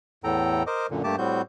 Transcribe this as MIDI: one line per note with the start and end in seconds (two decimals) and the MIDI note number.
0.24 0.63 40
0.24 0.63 45
0.24 0.63 69
0.24 0.63 79
0.24 0.63 82
0.67 0.86 70
0.67 0.86 72
0.67 0.86 75
0.67 0.86 86
0.91 1.02 42
0.91 1.02 46
0.91 1.02 50
1.04 1.16 43
1.04 1.16 57
1.04 1.16 58
1.04 1.16 67
1.04 1.16 81
1.04 1.16 86
1.18 1.42 45
1.18 1.42 55
1.18 1.42 60
1.18 1.42 66
1.18 1.42 91